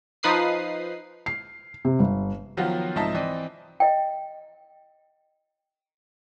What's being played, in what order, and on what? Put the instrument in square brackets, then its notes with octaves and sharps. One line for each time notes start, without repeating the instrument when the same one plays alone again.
[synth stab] F3 D#4 B4 D#6 C7
[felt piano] C7
C3
G1
[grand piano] D#3 F3 F#3 B3 F4 F#4
C2 G#2 F3 D#4 E5 A5
E3 C4 D5 D#5
[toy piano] D#5 G5